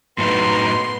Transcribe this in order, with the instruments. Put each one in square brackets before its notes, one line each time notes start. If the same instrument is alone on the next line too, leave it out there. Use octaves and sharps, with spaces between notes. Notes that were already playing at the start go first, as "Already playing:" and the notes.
[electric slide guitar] A2 F#3 D#4 [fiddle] B3 C6